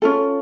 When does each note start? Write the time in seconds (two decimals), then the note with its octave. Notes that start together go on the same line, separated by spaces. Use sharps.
0.02 C#4 F4 A4